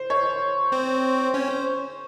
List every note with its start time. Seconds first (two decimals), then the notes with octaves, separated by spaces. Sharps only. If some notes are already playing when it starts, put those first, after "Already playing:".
Already playing: C5
0.10 C#5
0.72 C4 C5
1.34 C#4 C#5
1.50 C5